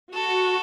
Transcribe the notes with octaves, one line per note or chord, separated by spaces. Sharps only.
F#4 A4